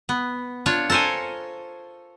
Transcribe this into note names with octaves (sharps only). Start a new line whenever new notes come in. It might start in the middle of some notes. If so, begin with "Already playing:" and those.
B3
D4 F4 C#5
A4 A#4 C5 C#5 G#5